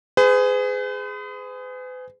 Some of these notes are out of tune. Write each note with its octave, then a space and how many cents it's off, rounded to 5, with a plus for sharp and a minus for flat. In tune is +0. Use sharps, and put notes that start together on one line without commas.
G#4 +0 B4 +45